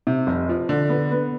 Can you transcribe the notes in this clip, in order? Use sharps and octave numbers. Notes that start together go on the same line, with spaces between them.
C3
F1
F3
D3
B3
B3